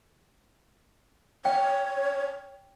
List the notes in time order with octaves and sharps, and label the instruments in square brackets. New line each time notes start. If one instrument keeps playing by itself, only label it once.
[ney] C#5 [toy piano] G5